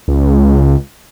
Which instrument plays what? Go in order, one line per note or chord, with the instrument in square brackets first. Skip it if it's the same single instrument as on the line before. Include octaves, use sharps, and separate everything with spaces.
[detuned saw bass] C#2